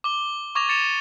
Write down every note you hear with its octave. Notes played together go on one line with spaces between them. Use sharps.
D6 G7
C#6 D6 G#6 A#6 F7
A6 C#7 E7 F7